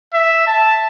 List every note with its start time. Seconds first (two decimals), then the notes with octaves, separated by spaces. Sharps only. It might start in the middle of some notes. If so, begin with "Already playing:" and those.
0.14 E5
0.47 A5